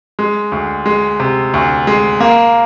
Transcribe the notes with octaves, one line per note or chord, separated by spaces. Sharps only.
G#3
D2
G#3
C3
D2
G#3
A#3